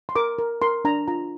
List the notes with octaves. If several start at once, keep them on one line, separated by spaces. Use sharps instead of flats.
C6
A#4 D6
A#4
A#4 C6
D4 A#5
F4 A#5